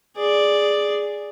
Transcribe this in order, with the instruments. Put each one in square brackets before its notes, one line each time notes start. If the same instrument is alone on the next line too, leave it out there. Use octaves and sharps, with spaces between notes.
[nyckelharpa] G#4 D5